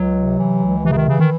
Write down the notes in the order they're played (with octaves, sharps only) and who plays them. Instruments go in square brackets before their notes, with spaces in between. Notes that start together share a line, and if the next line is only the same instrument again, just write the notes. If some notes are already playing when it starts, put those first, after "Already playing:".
Already playing: [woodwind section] C#2 [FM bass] F#3
[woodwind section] C3
E3
C#2
[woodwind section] C3 [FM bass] E3
[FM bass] C#3
D#3
[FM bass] C#3 [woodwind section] E3
[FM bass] D#3